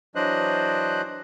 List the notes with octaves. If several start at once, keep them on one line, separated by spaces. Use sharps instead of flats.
E3 F#3 D4 C5 D#5 F#6